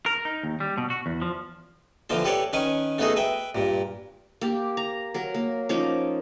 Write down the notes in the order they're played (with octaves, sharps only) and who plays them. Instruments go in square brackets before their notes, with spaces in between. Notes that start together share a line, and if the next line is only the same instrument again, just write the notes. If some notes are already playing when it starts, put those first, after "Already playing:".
[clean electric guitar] A#4
D#4
D#2
G3
B2
F#4
E2
F3
[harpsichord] D3 E3 F3 A#3 C5
G4 A4 B4 C#5 D5
D#3 C#4 B4 G#5 C#6
A3 B3 D#4 F#4 G#4 A4
B4 E5 G5
G2 A#2
[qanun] A#3 G4
A#5
F#3 A#4
A#3
F3 C#4 D#4 D6